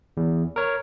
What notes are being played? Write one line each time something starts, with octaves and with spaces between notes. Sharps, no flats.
E2
A#4 C#5